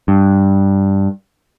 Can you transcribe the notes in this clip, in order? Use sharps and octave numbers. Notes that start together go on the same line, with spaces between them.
G2